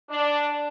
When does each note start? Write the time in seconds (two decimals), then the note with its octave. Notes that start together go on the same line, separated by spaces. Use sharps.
0.10 D4